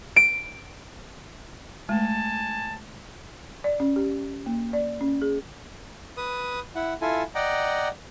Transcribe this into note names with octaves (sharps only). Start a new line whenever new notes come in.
D7
G#3 A3 G#5 A5
D5
C#4
G4
A#3
D5
C#4
G#4
B4 D#6
E4 F#5
E4 F4 A4 G#5
D5 D#5 F#5 G5 A#5